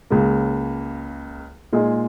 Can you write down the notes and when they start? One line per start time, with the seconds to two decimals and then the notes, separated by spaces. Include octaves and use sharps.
0.10 C#2 C#3 A#3
1.73 A#2 G#3 D#4 G#4